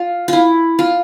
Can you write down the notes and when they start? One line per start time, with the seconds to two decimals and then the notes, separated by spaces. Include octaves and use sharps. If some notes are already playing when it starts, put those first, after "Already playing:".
Already playing: F4
0.28 E4 F4
0.79 F4